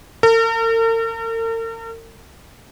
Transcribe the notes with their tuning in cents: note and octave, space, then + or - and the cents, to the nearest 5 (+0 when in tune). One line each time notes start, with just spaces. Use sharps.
A#4 -45